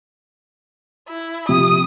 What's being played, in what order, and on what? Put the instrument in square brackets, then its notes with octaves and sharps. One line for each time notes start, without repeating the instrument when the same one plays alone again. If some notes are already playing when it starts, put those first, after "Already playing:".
[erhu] E4
[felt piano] C3 F3 [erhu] D#6